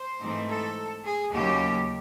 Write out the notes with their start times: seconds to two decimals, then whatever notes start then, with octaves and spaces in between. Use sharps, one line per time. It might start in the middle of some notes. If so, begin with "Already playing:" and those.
Already playing: C5
0.20 G#2 E3 A3 C4 D#4
0.48 A4
1.05 G#4
1.34 D#2 C#3 F#3 A#3 G4